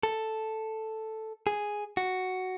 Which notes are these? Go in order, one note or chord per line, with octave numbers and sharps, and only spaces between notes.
A4
G#4
F#4